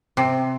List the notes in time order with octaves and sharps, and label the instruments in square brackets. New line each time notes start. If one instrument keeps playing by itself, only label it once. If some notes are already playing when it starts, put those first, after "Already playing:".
[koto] C3